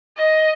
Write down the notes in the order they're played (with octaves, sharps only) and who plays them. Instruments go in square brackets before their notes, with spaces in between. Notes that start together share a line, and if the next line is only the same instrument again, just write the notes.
[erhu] D#5